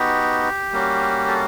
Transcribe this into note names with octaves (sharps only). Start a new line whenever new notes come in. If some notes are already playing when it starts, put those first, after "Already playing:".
Already playing: B3 D#4 F#4 G4
G3 A#3 C#4 F#4
A4